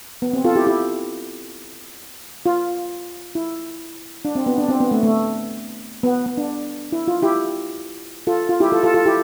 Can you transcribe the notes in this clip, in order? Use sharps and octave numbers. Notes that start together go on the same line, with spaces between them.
B3
C4
F4 A4
E4 G4
E4 G4
F4
E4
D4
C4
B3
D4
C4
B3
A3
A3
B3
B3
D4
E4
F4
E4 G4
F4 A4
F4
E4 G4
F4 A4
F4 A4
F4 A4
E4 G4